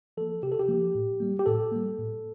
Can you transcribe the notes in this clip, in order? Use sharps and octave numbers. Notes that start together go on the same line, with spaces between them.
F3 A#3 A4
C3 G4
A4
G4
F3 A#3
A2
G3 A#3
G4
A2 A4
G3 A#3
A2